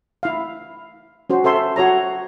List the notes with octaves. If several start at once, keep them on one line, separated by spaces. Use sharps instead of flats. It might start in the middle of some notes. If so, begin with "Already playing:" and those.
E4 F5
C#4 F#4 C5
A4 C5 E5 C6
F#4 C#5 A#5